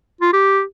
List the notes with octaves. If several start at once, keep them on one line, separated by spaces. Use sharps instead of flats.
F4
G4